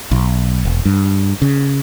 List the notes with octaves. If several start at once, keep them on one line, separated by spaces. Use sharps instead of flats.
B1
E1
G2
C#3